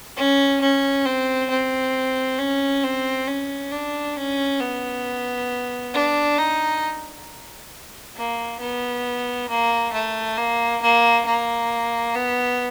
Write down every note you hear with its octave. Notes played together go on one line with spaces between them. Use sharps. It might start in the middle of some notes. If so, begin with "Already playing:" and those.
C#4
C#4
C4
C4
C#4
C4
C#4
D4
C#4
B3
D4
D#4
A#3
B3
A#3
A3
A#3
A#3
A#3
B3